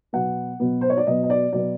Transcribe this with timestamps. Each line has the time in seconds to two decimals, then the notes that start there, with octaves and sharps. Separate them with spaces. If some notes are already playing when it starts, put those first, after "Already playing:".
0.13 B2 F#3 B3 F#5
0.60 B2 F#3 B3
0.81 C5
0.90 C#5
0.97 D5
1.07 B2 F#3 B3 D#5
1.23 D#5
1.30 D5
1.52 B2 F#3 B3 D5